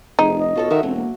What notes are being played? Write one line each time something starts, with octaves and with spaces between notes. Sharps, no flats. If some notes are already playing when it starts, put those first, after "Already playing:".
F1 D2 D#4 G#4
D#5
B2 F4 A4 C#5
D#3 F#4 A#4 E5
E1 F#3 C4
A#3